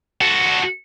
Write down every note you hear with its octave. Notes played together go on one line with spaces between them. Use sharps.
F#4 A4